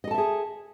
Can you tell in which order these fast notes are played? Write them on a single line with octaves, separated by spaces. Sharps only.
D#5 A4 A5 E5 G#4